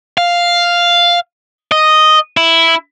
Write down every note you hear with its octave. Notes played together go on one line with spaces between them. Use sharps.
F5
D#5
E4